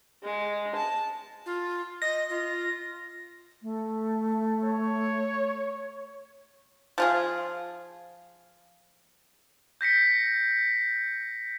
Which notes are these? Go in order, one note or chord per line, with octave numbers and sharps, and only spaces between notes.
G#3
A5
F4
D#5 A#6
F4
A3
C#5
F3 F4 G#4
G6 A#6 B6 C#7